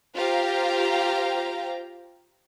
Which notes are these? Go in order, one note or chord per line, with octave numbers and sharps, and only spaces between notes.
F4 G4 C5 F5 G5 A#5